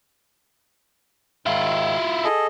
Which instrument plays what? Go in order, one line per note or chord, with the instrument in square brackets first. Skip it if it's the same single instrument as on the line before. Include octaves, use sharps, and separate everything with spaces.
[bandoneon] G#2 D#3 [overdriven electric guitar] E4 F4
[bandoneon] G#4 A4 D#5